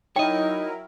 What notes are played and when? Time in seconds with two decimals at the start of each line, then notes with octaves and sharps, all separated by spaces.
0.16 F#3 D#4 E4 A#4 C#5 D#5 G5